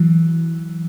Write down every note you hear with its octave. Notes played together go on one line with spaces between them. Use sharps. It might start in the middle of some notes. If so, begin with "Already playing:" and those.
Already playing: E3 F#3